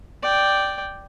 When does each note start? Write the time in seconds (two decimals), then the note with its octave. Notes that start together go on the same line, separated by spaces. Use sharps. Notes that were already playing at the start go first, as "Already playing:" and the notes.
0.22 D5 G5